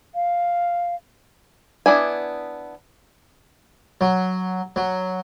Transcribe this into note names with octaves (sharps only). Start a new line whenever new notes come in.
F5
B3 D4 E4 G#5
F#3
F#3